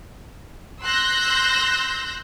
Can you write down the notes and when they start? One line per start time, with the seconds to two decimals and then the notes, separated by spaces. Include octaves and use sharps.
0.83 C6 E6 F#6 G6 A#6